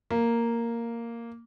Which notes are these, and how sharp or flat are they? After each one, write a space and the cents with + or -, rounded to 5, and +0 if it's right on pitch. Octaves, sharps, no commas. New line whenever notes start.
A#3 -5